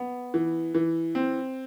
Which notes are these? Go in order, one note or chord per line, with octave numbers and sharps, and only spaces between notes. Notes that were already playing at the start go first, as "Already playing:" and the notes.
Already playing: B3
E3
E3
C4